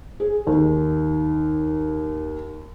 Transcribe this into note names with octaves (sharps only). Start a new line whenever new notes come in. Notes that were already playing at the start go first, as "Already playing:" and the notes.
G#4
D#2